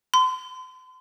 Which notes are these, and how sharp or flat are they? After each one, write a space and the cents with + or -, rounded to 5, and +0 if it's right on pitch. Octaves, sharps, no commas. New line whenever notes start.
C6 -40